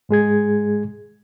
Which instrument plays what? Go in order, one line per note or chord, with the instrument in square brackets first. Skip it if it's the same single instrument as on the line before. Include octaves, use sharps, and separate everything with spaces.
[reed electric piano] G#2 G#3 G#4 G#6